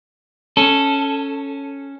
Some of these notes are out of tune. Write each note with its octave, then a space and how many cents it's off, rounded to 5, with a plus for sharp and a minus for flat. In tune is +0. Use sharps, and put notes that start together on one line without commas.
C#4 +0 A4 +0